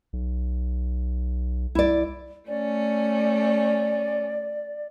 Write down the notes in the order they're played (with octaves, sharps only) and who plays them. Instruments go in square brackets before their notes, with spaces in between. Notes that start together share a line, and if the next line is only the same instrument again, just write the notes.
[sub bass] B1
[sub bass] C2 [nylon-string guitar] E4 D5
[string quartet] A3 C#4 [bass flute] D5